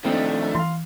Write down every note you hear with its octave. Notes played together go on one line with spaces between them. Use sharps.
D#3 F3 A3 C4 D4 D#4
E3 F5 C6